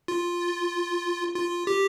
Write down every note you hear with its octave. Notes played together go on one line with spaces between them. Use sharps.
F4
F4
G4